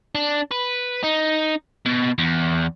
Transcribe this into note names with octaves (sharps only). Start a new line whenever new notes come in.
D4
B4
D#4
B2
E2